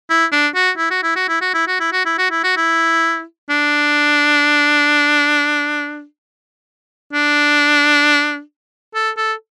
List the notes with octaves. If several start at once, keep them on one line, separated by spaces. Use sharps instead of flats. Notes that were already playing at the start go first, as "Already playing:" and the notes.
E4
D4
F#4
E4
F#4
E4
F#4
E4
F#4
E4
F#4
E4
F#4
E4
F#4
E4
F#4
E4
D4
D4
A4
A4